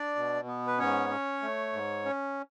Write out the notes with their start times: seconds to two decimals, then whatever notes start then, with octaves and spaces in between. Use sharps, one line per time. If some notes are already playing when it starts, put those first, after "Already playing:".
Already playing: D4 D5
0.16 B2
0.47 B3
0.67 B4
0.78 G#2 C#4 C#5
1.10 C#4
1.42 A3
1.73 G#2
2.05 C#4